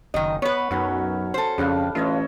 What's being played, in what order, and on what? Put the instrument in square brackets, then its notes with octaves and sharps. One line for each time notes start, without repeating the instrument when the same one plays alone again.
[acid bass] F#1 [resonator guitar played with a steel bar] D#3 D#5
[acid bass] B3 [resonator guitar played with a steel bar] B4 C#5
[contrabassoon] B1 [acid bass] F#2 [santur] F#3 C#4 B5
[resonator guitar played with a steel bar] A4 C5
[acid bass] F2 [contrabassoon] C#3 [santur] G3 D4 F5
[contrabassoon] A1 [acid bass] F4 [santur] C#5 D#5 E5